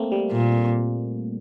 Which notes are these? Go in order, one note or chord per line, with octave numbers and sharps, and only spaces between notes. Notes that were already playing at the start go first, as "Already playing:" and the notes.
Already playing: A3 A#3 C4
G3
A#2